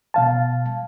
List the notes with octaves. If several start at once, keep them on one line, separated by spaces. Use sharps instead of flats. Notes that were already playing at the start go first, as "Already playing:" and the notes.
B2 F5 A5